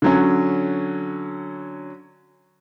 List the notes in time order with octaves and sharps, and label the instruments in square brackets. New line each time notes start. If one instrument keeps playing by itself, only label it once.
[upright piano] D3 F#3 C#4